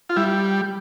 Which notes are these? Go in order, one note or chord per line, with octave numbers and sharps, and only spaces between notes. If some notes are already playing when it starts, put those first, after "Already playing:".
F4
G3 E4